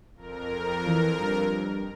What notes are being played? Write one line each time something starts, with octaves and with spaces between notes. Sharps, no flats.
F2 A#4
E3
G2